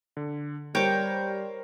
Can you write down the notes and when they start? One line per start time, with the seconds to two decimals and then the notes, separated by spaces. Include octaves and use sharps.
0.17 D3
0.75 G3 A#4 C5 C#5 G5 D6